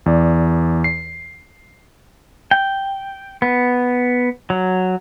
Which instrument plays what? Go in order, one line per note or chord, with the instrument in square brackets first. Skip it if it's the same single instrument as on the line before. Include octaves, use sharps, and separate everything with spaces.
[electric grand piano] E2 D5
C7
[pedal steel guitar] G5
B3
F#3